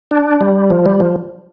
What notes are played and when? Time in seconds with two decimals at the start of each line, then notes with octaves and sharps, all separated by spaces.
0.11 D4
0.41 G3
0.70 F3
0.86 G3
1.00 F3